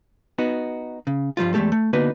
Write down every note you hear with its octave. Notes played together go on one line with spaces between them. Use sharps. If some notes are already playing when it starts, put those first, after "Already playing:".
B3 D#4 F#4
C#3
G2 F3 G3 F4
E2 G#3 A3 G4 A4
A3
D3 A#3 B3 D#4 F#4 B4